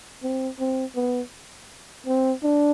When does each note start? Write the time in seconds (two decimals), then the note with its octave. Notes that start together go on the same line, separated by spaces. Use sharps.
0.23 C4
0.59 C4
0.95 B3
2.06 C4
2.43 D4